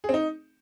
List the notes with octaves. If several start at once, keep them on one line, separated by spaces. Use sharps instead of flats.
G#4
C4
D#4